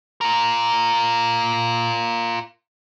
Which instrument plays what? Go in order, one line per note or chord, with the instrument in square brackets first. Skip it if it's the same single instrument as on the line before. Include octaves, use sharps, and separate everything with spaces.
[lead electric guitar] F4 A#4